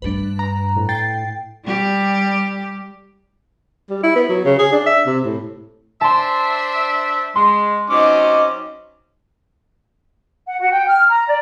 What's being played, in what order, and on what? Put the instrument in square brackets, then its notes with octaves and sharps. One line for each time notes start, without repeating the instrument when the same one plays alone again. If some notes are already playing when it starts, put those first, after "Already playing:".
[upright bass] G2 A3 [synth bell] D4 B4
[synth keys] A#5
[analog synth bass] A2
[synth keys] G5 A6 [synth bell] C7
[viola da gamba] G3 G4
[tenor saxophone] G3
E4
B3
F#3
C#3
G#4
D4
E5
C3
A2
[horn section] D4 C5 E5 [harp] A5 C6
[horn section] G#3 [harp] C6
[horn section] F#3 C4 C#4 [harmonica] D#4 D6
[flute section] F#5
F#4
G5
F6
A#5
D5